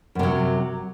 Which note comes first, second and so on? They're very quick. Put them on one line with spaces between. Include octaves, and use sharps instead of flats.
F#2 C3 F#3